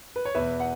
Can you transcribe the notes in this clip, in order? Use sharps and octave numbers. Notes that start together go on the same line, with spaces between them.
B4
C#5
E2 B2 B4 E5
F#5